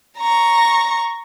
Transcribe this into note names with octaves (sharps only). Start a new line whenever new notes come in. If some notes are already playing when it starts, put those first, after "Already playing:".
A#5 C#6